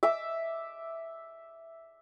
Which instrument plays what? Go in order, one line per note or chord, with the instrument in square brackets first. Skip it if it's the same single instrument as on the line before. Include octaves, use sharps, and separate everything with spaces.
[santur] E5 D6 E6